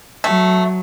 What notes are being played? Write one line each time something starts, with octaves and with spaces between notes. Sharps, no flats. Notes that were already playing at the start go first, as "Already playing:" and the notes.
F#3 A3